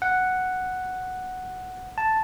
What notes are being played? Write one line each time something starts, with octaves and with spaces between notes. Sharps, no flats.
F#5
A5